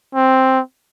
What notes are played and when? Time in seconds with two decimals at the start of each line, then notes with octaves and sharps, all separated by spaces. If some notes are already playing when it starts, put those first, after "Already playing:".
0.15 C4